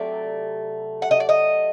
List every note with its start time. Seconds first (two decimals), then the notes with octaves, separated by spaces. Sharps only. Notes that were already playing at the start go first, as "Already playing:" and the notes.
Already playing: C3 F#3 A3 D5
1.02 F#5
1.11 D#5
1.20 D5
1.29 D#5